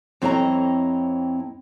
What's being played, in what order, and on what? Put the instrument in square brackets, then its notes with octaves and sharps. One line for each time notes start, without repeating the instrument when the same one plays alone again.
[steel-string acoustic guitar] F2 C4 E4 C#5 D#5 A#5